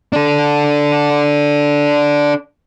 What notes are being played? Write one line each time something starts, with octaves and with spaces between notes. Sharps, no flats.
D4 A4